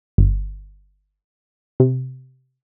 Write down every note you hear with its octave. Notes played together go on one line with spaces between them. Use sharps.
G1
C3